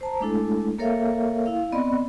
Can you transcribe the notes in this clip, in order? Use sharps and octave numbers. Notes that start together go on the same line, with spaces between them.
C5 A5 A#5
G#3 A3 D4 E4 A4
A#3 A4 A#4 C#5 E5 F5
E4 F5
B3 C4 D5 D#5 B5